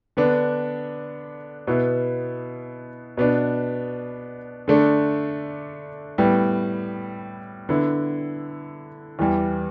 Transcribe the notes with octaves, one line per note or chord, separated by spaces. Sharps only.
D3 B3 D4
B2 B3 E4
B2 B3 D4
D3 A3 D4
A2 G3 B3
D3 B3 E4
E2 E3 G3